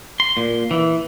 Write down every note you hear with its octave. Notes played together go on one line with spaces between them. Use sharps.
C6
A#2
E3